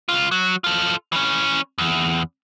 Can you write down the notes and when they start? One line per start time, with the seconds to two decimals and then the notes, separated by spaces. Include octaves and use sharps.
0.09 C#2 F4
0.31 F#3
0.64 F4 A4
1.12 E3 C#4
1.78 E2